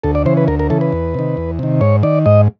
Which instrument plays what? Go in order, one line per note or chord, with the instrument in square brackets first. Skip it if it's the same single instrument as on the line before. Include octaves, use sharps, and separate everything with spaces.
[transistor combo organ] D2 A4
D5
C#3 E3 C5
B4
D2 A#4
A#4
C#3 E3 A4
B4
E2
C3 D#3
E2
C3 D#3
G#2 C#5
D#3 D5
G#2 D#5